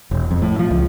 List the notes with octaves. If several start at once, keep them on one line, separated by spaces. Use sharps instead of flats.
E1
F2
A2
F3
C#2